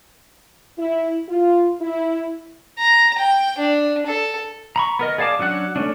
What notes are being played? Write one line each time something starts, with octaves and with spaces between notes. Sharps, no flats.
E4
F4
E4
A#5
G5
D4
A4
A#5 B5 C#6
B3 A#4 D#5
G#4 D5 F5 A5 D6
F#3 C#4 D4 F#5 F#6
A3 C#4 D4